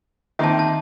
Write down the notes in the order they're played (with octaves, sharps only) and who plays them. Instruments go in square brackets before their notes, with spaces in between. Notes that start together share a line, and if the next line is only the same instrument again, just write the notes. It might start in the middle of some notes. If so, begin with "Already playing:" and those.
[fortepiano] D#3 A#3 C4 [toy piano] E5 A5
[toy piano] A5